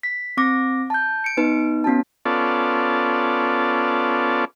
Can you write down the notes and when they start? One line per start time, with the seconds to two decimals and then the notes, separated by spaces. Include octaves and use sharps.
0.03 B6
0.37 C4 D6 A#6
0.90 A5 G6
1.24 C#7 D7
1.37 B3 D#4 B4
1.84 B3 C#4 F#4 A5
2.25 B3 C#4 F4 A4 D5